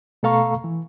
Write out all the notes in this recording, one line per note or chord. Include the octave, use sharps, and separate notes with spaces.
B2 A3 A4 F5 A#5 C#6
E3